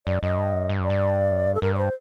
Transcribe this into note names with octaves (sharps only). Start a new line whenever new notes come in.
F#2 D5
F#2 D#5
G2
F#2
G2
F#2 D5
G2
F#2
G2
A4
G2 A#4
D5
C5